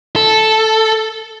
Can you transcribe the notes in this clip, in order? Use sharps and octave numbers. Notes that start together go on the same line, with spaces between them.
A4